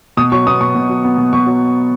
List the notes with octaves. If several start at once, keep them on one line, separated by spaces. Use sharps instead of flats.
B2 D#6
F#3 C#6
B3 D#6
B2 C#6
B2
F#3
B3
B2
B2 C#6
F#3